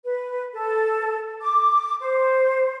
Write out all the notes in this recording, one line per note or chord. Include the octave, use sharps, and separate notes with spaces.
B4
A4
D6
C5